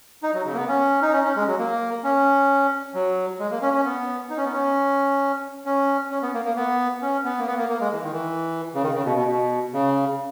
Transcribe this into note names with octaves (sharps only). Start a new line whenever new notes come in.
D#4
F#3
C#3
A#3
B3
C#4
D#4
C#4
C#4
G#3
F#3
A#3
C#4
F#3
G#3
A#3
C#4
C#4
B3
D#4
C#4
B3
C#4
C#4
C#4
B3
A#3
A#3
B3
C#4
B3
A#3
B3
A#3
A#3
G#3
E3
D#3
E3
C#3
D#3
C#3
B2
B2
B2
C#3